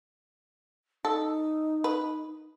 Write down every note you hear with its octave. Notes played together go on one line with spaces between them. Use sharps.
D#4 A4
B4